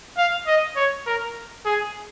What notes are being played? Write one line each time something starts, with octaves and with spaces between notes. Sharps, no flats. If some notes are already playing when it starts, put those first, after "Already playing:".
F5
D#5
C#5
A#4
G#4